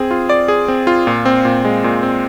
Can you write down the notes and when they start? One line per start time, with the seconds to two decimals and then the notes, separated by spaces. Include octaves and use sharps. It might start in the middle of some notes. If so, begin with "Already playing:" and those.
Already playing: C4 G#4
0.11 F4
0.29 D5
0.48 G#4
0.68 C4
0.87 F4
1.07 A#2
1.25 C4
1.45 A#2
1.65 G#3
1.84 A#2
2.03 C4